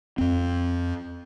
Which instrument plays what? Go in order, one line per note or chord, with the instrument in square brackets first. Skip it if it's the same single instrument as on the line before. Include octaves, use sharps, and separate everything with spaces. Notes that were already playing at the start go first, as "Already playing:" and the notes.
[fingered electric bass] F2 C4